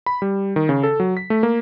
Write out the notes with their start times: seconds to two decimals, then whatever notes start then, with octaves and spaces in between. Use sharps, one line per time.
0.06 B5
0.22 G3
0.56 D#3
0.69 C#3
0.83 A4
1.00 F#3
1.17 B6
1.30 A3
1.43 A#3